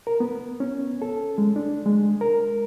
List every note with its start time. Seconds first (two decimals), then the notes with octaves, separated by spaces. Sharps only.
0.07 A#4
0.20 B3
0.60 C#4
1.02 A4
1.38 G#3
1.56 D4
1.86 G#3
2.21 A#4